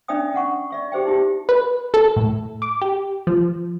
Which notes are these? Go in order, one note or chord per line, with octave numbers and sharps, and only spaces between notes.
C#4 D4 D5 E5 G5 D#6
C#4 F#5 C#6
D5 E5 C#6
G4 G#4 C5 E5 G5
D#4 E4 G4
B4
A4
A2
D6
G4
F3